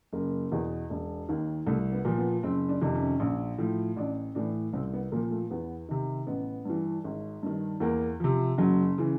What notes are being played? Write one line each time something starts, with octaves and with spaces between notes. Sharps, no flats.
F#1 A#3
E2 B2
E1
D#2 D#3
C2 A3
B3
A#2 F3
B3
F#1 C4
D4
F2 C3 D#3
C#4
A#1
A2 F3
A1 D4
A2 E3 D4
C2 C4
B3
A#2 F3 A#3
A3
E2 B3
C3 D#3
A1 B3
G2 E3
G#1
G2 D#3
E2 A#3
C3 F3
F#1 F#3
C#3 E3